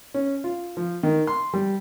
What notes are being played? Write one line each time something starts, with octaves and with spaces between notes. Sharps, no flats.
C#4
F4
F3
D#3
C6
G3